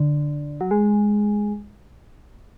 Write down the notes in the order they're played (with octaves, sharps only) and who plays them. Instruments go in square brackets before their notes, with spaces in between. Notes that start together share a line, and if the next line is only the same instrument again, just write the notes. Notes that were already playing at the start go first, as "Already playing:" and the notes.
Already playing: [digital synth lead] D3
F#3
G#3